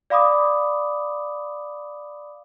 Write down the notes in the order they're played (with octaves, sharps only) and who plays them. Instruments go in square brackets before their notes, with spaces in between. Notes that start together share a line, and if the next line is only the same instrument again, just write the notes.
[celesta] D5 F5 B5 D6 D#6